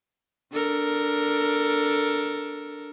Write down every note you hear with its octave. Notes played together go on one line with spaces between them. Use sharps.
D4 A4 A#4